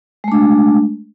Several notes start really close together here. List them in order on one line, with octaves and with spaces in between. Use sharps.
G#3 A3 D4